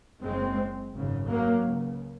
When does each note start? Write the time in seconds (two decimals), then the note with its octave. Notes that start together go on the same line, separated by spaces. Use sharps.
0.23 F#1 F#2 C#3 G#3 C4
0.95 G#1 F#2 C#3
1.30 F#3 A#3
1.66 C#2 C#3